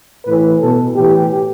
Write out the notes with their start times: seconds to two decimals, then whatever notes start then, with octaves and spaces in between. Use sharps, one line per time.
0.26 A2 E3 B4
0.61 B2 A4
0.96 A2 E3 G4